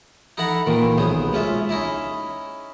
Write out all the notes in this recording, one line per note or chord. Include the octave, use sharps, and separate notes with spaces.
D#4 E4 A4 F#5 A#5 B5
A#2 D#3 E3
B1 B3 G#4 C5
G#3 C#4 F4 E5
C#4 D#4 E4 E5